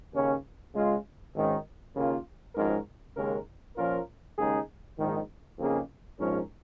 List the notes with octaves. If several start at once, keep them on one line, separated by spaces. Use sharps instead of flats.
D#2 C#3 A#3 C#4
C#3 G#3 F4
G#1 G#2 D#3 C#4
D#2 C#3 A#3 F4
G#1 G#2 F3 C#4 A#4
D#2 C#3 G#3 C#4 A#4
A#2 F3 C#4 F4 A#4
D#2 C#3 G#3 D#4 G#4
A#1 G#2 D#3
F2 C#3 A#3 D#4 G#4
A#1 G#2 F3 C#4 A#4